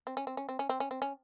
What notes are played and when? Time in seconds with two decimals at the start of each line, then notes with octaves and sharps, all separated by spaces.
0.07 C4
0.17 C#4
0.27 C4
0.37 C#4
0.49 C4
0.59 C#4
0.69 C4
0.80 C#4
0.91 C4
1.02 C#4